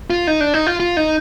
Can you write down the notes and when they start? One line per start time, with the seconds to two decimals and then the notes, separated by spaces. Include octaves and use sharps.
0.10 F4
0.27 D#4
0.41 D4
0.54 D#4
0.67 F4
0.80 F4
0.97 D#4